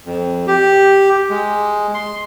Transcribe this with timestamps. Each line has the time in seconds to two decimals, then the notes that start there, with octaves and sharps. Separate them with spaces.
0.06 F2
0.47 G4
1.30 G#3
1.94 C6